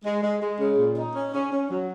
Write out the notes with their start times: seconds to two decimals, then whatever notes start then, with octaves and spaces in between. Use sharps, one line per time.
0.05 G#3
0.23 G#3
0.42 G#3
0.60 C#3
0.78 A#2
0.97 D#4
1.15 C#4
1.33 C#4
1.52 C#4
1.70 F#3